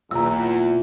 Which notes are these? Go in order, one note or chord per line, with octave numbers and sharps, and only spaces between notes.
F#1 B1 E2 F4 G5 A#5 D6 E6